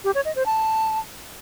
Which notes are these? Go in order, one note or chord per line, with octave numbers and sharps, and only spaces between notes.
G4
C#5
D#5
C5
A5